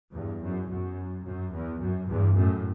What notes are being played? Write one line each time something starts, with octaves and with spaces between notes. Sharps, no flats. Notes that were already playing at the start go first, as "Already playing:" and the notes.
E2 G2
F#2
F#2
F#2
E2
F#2
E2 G2
F#2 A2